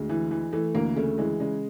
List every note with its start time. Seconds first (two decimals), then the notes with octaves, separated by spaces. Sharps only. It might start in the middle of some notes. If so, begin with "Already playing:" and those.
Already playing: D2 G#3
0.09 E3
0.31 E3
0.53 E3 A3
0.75 D2 A#3
0.96 C#3 A3
1.18 E3 G#3
1.40 C#3 G#3